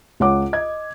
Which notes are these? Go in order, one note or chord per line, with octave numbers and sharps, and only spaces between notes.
C#2 C#5 F#5 D6
D#5 G#6